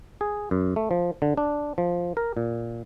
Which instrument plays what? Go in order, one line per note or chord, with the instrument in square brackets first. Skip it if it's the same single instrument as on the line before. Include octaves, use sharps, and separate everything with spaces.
[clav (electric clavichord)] G#4
F#2
A3
F3
D3
D4
F3
A#4
A#2